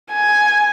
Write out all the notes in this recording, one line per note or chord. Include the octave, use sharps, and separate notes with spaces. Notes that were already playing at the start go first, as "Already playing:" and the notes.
G#5